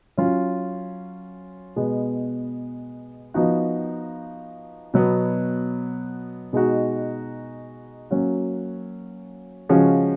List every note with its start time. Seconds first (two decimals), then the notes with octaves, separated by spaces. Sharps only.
0.18 F#3 C#4 F4
1.76 B2 G#3 B3
3.34 F3 B3 D#4 F#4
4.94 B2 F#3 B3
6.53 B2 G#3 D#4 F#4
8.10 F#3 A#3 C#4 F#4
9.69 C#3 F3 G#3 C#4 F#4